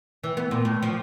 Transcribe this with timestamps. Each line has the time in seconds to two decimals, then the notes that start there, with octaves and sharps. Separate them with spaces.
0.23 E3
0.37 B3
0.51 A#2
0.65 A2
0.83 F3